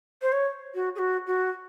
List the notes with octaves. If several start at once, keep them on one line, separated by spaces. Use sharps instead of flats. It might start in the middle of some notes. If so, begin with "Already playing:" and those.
C5
C#5
F#4
G#4
F#4
F#4